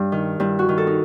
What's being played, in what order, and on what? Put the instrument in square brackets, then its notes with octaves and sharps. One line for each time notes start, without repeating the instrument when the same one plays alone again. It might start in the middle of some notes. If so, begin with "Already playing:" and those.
Already playing: [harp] G2
D#3
G2 E4
F#4
D#3
A4
D#4